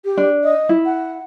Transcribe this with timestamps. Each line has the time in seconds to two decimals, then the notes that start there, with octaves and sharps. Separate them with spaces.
0.05 G4
0.17 D4
0.43 D#5
0.69 E4
0.85 F#5